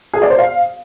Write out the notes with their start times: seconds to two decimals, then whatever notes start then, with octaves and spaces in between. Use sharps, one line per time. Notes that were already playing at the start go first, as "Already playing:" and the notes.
0.13 G#4
0.22 D5
0.30 C5
0.38 F5